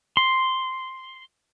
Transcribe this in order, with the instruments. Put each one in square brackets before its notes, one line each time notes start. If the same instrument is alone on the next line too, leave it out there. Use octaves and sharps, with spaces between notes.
[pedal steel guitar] C6